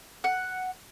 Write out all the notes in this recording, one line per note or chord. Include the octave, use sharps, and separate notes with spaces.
F#5